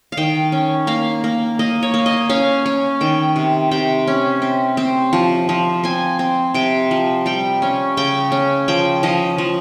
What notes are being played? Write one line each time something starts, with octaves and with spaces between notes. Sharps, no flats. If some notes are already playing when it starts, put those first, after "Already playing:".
F5
D#3 G5
C#4
A#3 F5
A#3
A#3 D#5
C#5
A#3
D#5
C#4 F5
C#4
D#3 G5
C3
C3 G5
C#4
C4
C4
F3
F3
C4 G#5
C4
C3 G5
F3
G3 G5
C#4
C#3 G5
C#4
F3 G5
F3 D#5
F3